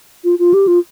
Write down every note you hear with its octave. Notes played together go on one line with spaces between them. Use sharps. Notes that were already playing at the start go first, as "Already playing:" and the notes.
F4
F4
G4
F4